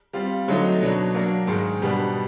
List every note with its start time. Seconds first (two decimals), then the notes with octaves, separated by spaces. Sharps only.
0.13 G3 C4 F4
0.48 D3 F#3 A3 C4 D#4
0.81 B2 F#3 B3 D4
1.14 F#3 A#3 D4
1.47 G#2 D#3 G#3
1.82 B2 G3 B3 D4